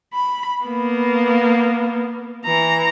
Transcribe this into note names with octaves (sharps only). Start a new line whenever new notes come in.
B5
A#3 B3
E3 A#5